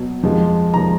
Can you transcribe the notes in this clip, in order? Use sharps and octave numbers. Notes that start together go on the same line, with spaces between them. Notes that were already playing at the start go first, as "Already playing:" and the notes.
Already playing: B2 F#3
F2 F3 G#3
F3 G#3 A#5